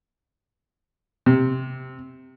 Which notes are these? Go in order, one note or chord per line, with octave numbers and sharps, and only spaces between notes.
C3